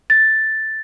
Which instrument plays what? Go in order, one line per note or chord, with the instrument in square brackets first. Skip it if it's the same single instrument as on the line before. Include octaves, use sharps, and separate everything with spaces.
[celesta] A6